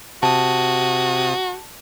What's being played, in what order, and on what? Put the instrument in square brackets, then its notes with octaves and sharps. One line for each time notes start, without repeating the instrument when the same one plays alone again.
[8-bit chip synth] C3 D#6 [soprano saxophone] F#4 [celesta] A5